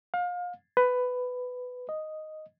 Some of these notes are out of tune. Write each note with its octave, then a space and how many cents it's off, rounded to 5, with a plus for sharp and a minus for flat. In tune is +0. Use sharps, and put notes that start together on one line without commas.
F5 +30
B4 +15
D#5 +0